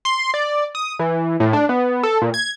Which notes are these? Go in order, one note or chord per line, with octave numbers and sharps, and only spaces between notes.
C6
D5
D#6
E3
A2
D4
B3
A4
A#2
G#6